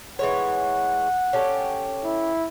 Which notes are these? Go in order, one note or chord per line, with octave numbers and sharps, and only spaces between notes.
E3 G#3 C#5 F#5
C#4 G4 A4
E4